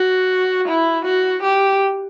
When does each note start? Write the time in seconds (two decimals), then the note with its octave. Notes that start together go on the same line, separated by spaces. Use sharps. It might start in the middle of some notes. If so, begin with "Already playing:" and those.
Already playing: F#4
0.68 E4
1.05 F#4
1.43 G4